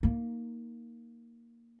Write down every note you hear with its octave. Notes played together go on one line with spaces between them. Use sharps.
A#3 D#4